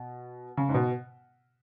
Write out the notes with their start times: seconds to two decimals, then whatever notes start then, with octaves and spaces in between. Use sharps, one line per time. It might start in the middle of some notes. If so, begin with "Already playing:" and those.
Already playing: B2
0.57 C#3
0.69 G#2
0.74 B2